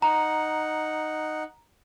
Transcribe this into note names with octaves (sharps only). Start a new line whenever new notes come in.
D#4 F#5 A#5